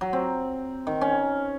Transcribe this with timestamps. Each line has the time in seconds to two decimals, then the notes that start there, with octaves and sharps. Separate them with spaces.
0.01 F#3
0.13 C4
0.87 D#3
1.01 C#4